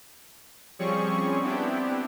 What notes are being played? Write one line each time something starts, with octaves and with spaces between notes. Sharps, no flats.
F3 G3 C4 C#4 G#4 C#6
B3 C4 D4 E4 G4